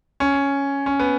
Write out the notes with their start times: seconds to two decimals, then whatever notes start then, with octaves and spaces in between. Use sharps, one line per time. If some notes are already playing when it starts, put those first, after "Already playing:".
0.20 C#4
0.86 C#4
0.99 B3